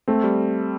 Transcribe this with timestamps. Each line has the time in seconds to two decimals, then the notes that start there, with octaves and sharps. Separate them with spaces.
0.08 A3 C4
0.24 G3